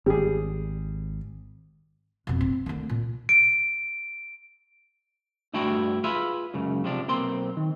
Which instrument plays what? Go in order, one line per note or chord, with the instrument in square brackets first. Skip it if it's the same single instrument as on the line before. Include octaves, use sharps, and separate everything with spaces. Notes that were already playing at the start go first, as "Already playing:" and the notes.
[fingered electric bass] G#1 [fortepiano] G3 G#4
[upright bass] F2 B2
C4
D2 D#3
A#2
[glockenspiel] D7
[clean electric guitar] G2 A3 D4 E4 F#4 G5
F4 G#4 B4 E5
C#2 F#2 C#3
C3 F3 D4
B1 A#3 C4 C6
D#3